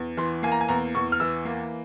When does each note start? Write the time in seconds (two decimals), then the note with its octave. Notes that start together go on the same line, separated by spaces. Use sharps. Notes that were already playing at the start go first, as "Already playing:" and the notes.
Already playing: E2
0.17 E3 C6
0.43 A#3 G#5
0.52 A#5
0.61 G#5
0.68 E2 A#5
0.95 E2 C#6
1.12 F6
1.20 E3 E6
1.45 A#3